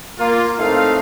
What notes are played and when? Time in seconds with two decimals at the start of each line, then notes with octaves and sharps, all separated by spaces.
0.18 A#3 F4
0.59 A2 A3 C4 D#4 F5